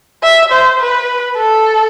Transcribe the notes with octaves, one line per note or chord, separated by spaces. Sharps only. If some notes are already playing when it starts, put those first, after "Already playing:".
E5
C5
B4
A4